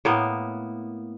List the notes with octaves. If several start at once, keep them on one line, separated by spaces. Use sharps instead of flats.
A2 A#3 B3